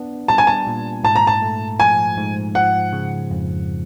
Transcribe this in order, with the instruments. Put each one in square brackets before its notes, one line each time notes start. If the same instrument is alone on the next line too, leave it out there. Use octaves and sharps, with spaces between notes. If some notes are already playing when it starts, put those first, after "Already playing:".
Already playing: [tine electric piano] B3 D4
[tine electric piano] G3 [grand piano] A5
[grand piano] G#5
A5
[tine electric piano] A#2
[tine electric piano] G#2 [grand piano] A5
[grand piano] A#5
A5
[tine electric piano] A3
[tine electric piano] F3 [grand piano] G#5
[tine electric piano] G#2
[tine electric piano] F3 [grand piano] F#5
[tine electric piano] C#3
F2